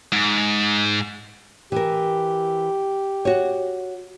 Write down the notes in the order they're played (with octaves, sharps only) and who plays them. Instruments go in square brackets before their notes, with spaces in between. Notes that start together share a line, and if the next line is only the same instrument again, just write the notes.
[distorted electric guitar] G#2
[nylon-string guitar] E3 A#4 [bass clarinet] G4
[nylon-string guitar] F#4 C#5